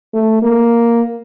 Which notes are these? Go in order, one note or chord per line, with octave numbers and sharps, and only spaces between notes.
A3
A#3